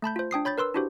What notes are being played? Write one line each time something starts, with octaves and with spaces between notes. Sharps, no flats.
A3 A5 B5 G6
F4 C5
D4 G5 D#6 C7
C#5 B5 G6 A6
A#4 B4 C6 E6
D4 E4 F#4 G4 C5